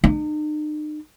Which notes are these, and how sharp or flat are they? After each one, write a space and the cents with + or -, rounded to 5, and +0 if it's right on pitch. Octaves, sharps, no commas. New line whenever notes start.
D#4 -45